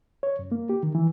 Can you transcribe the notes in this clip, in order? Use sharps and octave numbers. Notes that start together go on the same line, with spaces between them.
C#5
F#2
A#3
G4
D#3
E3